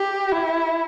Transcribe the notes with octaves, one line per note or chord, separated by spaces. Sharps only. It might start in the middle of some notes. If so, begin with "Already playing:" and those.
Already playing: G4
E4